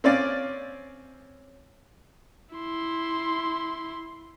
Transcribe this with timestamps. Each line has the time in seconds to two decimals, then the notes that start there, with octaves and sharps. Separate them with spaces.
0.04 C4 C#4 D5 F5
2.55 E4 C6